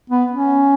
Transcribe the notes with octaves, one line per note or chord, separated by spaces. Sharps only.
B3
C#4